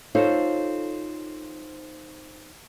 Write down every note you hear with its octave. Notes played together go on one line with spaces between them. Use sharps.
C4 D#4 F4 A4 C5 C#5